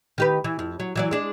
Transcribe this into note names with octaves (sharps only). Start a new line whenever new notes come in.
D#3 G4 B4
E3
F2
F#3
E3 F#3 D5
G#3 D4